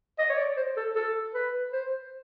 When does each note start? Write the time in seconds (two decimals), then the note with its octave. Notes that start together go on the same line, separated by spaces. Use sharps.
0.18 D#5
0.29 C#5
0.37 D5
0.57 C5
0.77 A4
0.96 A4
1.34 B4
1.73 C5